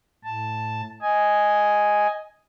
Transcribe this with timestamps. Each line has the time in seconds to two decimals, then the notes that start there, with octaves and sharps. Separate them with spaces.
0.24 A2 A5
1.02 D#5 G#5